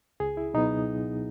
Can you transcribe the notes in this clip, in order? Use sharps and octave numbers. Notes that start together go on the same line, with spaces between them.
C#2 G#4
E4
B2 F#3 B3 D#4